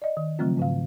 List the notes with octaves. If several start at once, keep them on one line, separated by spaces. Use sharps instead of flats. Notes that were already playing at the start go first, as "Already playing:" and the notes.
D5 D#5
D#3
C#3 F3 F#3 A3 C4 F4
G#2 C#3 F5